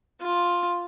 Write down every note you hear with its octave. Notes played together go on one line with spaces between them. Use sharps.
F4